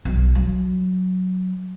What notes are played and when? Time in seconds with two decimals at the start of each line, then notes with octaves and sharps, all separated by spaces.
0.05 B1
0.35 F#3